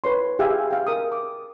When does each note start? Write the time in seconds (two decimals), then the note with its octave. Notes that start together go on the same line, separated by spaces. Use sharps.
0.04 B4 C#5 C6
0.39 G4 G#4 E5 F5 G5 G#5
0.71 F5 G5
0.87 A#4 D#6
1.12 D6